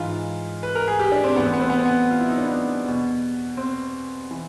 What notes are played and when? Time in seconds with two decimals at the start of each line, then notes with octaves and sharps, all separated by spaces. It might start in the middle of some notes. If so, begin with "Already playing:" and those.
Already playing: G#2 E3 F4
0.63 B4
0.75 A#4
0.88 G#4
1.00 G4
1.12 D4
1.24 C4
1.36 A2 E3 B3
1.45 C4
1.53 B3
1.61 C4
1.70 B3
1.78 C4
1.85 B3
2.10 F4
2.20 E4
2.29 D#4
2.38 D4
2.47 B3
2.84 E2 B2
3.57 C4
4.31 E3